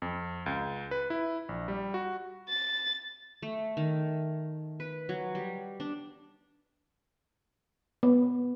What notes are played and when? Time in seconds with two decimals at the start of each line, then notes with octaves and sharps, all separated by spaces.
0.02 F2
0.46 C#2
0.91 B4
1.10 E4
1.49 A#1
1.68 G3
1.94 F#4
2.49 A6
3.42 A3
3.77 D#3
4.80 B4
5.09 F#3
5.35 G3
5.80 D4
8.03 B3